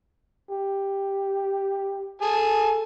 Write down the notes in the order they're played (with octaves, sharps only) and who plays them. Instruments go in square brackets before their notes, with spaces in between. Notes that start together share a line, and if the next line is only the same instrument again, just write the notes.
[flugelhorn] G4
[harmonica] G#4 G#5 A5 [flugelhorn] A4